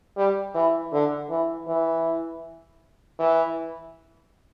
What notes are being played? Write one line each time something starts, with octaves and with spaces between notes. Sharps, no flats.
G3
E3
D3
E3
E3
E3